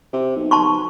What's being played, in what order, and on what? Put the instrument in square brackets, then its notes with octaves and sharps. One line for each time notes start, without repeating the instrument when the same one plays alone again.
[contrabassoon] C3
B1
[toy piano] A5 C6 C#6